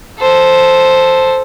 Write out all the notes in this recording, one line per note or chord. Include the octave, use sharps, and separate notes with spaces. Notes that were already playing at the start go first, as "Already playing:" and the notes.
A4 C5